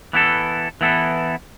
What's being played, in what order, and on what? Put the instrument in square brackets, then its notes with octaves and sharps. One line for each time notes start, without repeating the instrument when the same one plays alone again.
[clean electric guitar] E3 B3 E4 A4
E3 B3 E4 A4